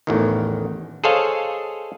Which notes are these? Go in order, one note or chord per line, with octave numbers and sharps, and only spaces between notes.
A1 E2 D#3
G#4 A4 C5 C#5 D#5 F5